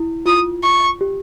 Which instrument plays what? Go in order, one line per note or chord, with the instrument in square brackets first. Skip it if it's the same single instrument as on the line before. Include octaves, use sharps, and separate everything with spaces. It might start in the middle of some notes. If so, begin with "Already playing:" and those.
Already playing: [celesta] E4
[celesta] F4 [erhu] D#6
[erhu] C#6
[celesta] G4